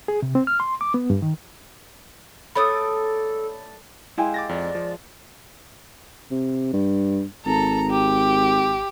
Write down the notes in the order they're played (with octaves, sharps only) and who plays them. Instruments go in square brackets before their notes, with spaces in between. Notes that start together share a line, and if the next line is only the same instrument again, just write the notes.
[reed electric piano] G#4
C3
C4
F6
C6
D6
B3
G2
D#3
[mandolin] A3 D4 D#6 [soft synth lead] A4 [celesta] C#5 B5
[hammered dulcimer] G#3 F5 [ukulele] E4 G4 G#5
[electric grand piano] D6 A6 A#6
[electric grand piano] F2 [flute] D5
[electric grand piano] F3
[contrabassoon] C3
G2
[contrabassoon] G#1 [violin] A4 A#5
[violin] G4